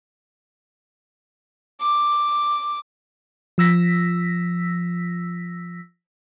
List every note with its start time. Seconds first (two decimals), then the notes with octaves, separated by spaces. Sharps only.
1.80 D6
3.58 F3 E6 A#6 B6